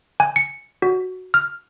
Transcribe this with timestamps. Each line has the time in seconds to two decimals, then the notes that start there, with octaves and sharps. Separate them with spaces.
0.20 G#5
0.36 C#7
0.82 F#4
1.34 F6